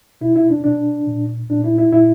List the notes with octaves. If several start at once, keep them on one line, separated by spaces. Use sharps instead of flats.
B2 E4
E4
D4
B2 D4
A#2
A#2 D4
E4
E4
A#2 E4